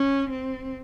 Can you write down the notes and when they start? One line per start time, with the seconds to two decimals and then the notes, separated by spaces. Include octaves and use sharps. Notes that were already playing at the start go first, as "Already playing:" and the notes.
Already playing: C#4
0.30 C4